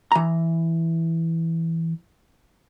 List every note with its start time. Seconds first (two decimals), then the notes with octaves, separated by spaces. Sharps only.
0.12 E3 A#5